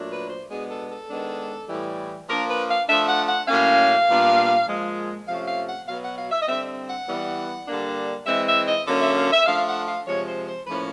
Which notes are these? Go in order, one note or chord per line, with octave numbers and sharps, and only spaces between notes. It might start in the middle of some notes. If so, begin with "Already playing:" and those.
Already playing: A#2 F#3 A3 D4
B4
C5
B2 G#3 B3 D4 G#4
A4
A4
D#3 G#3 B3 D4
A2 E3 G3
F3 A#3 D4 A#4
B4
F5
F3 A3 D4 E5
F#5
F#5
A2 F#3 A#3 C#4 F5
A#2 G3 B3 D4
A#2 F3 G#3
C3 F3 A3 C#4 F5
F5
F#5
B2 F#3 B3 F5
F#5
F5
E5
D#5
D3 G3 C4 E5
F#5
E3 G3 B3
D3 G3 A#3 D4
E3 G#3 C4 E5
E5
D#5
D3 F#3 A#3 C#4
E5
F5
E5
F3 A3 D4 F5
F#5
F5
C3 F3 G#3 C#5
C5
C5
A2 F3 A#3 C#4 B4